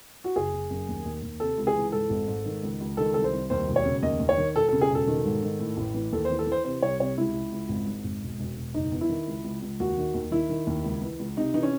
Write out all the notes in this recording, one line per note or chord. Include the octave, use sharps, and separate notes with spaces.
F#4
F#1 G#4
F#1
F#2
D#2
D#2
D#2
C3 A4
C#2
G#4
E3
G#2 A4
G#1
G#2
D#3
C#2
C#2
D#3 A4
C2 A4
C5
C2
D#2 C5
E1
C#5
C#3
D#2 D#5
D#2
C#5
D#3
E1 A4
C#3 A4
G#4
E1 A4
D#3
G#2
D#3
A2
A1
E3
D#2 A4
C5
E3
A4
E3 C5
C3 C5
C2 C#5
C3 C#5
C#2 E4
C#2
C#2
G#1
G#2
G#1
E1
E1
E1
F#1 D#4
E2
E4
D#3
C#2
C#2
C#2
D#2 F#4
D#3
D#2
D#3 E4
D#3
D#2
C#2
E3
C#2
C3 D#4
E3 D#4
C#4